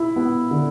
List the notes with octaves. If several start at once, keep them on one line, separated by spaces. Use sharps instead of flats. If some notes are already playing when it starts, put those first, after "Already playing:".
Already playing: E4
B3
D3